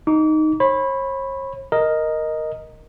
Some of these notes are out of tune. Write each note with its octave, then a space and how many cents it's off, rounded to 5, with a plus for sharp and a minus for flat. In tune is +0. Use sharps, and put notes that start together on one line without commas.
D#4 +0 D6 -35
C#5 -45 B5 +0
A#4 +0 D#5 +0